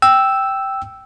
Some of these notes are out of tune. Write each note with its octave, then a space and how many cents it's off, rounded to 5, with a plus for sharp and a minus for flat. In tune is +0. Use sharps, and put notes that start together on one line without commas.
G5 -5 E6 +0